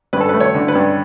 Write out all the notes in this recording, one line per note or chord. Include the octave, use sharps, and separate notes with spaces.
G2 B4
A4
B4
A3
C#5
D3
B4
G2